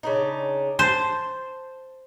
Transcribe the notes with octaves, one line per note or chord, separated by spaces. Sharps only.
C#3 D4 D#4
C5 A5